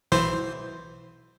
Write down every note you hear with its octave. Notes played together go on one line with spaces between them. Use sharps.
B1 E3 C5